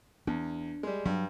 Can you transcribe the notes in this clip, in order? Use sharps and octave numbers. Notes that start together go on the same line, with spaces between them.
E2 D4
G3 G#3
G2 F#3